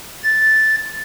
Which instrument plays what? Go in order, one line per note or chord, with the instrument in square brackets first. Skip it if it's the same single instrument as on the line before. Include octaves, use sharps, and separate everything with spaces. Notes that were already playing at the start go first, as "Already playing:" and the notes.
[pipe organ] A6